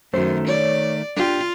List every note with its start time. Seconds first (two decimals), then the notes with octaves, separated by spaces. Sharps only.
0.14 F#2 D#3 A3 C5
0.48 C#5 D5
1.16 D4 F4 G4